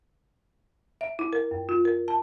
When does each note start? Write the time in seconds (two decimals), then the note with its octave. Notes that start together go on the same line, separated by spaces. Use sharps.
1.01 E5
1.19 E4
1.33 A#4
1.51 F#2
1.69 F4
1.85 A#4
2.08 A5